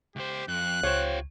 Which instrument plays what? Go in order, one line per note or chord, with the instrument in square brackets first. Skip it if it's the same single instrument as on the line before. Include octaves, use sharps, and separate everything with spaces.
[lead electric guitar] C#2 C5 [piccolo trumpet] G4
[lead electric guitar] F2 [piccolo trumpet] F#6
[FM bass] C#2 [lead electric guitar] F4 G4 [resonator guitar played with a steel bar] C5 C#5